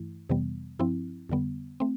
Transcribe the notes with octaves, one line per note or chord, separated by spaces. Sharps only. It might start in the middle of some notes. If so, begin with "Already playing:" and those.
Already playing: G2 E3 A3 E4
F2 C3 E3 G3 B3
G2 F3 C4 E4
F2 D3 G3 B3
A3 C4